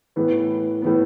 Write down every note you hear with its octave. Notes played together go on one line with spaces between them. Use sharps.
A2 E3 B3
A2 E3 B3